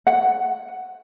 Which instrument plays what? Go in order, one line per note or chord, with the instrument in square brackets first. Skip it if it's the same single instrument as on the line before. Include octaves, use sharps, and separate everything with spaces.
[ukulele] F#5